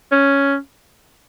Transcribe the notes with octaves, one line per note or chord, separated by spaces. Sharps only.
C#4